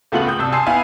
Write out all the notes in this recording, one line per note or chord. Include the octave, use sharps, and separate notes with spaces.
C#2 A3 B3 F4 F#4 F#7
G5 D#6 G6
C2 A5 E6
G#5 A5 C6 E6 C7
B3 E4 F5 G#5